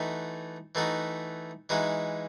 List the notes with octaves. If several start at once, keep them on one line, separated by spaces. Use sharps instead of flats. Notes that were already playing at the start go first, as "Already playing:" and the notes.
Already playing: E3 A3 D#4 F#4
E3 A3 D#4 F#4
E3 G#3 D#4 F#4